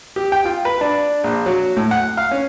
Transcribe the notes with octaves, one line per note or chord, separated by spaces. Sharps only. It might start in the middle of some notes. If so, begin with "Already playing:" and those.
G4
G5
F4
B4
D4
A#1
F#3
A2
F#5
F5
C#4